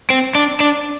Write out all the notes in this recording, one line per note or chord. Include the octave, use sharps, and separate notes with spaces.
C4
D4
D4